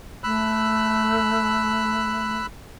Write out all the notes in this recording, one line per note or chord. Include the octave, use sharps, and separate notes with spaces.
A3 B5 E6 F#6